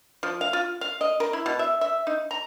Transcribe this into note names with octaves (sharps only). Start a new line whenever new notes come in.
F3
F5
F4
F5
D#5
A#4
E4
B2
E5
E5
D#4
A#5